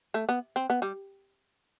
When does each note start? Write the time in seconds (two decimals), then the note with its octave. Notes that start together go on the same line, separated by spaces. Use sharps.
0.14 A3
0.29 B3
0.56 C4
0.70 B3
0.82 G3